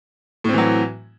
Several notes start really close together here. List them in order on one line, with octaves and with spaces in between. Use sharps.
A2 C4 E3 F#3